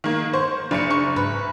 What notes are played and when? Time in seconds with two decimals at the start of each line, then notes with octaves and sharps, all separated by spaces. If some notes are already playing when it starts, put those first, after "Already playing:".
0.04 D#3 A#3
0.33 C5 C#6
0.71 F#1 D4 D5 C#7
0.90 C#6
1.16 G#2 B4